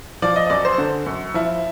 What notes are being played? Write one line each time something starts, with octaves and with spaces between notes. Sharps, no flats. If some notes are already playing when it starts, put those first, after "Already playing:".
F3 D5
D#5
D#5
F#2 D5
C5
D3
F#2
F3 E4